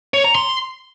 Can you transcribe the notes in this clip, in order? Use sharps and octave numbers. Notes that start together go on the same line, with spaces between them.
C#5
A#5
C6